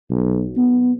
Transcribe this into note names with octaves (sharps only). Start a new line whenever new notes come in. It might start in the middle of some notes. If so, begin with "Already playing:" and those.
B1
B3